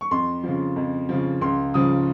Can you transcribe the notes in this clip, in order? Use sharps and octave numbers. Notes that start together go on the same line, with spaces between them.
C#6
F2 C6
C#3 F3
F2
C#3 F3
C#2 C6
C#3 F3 D#6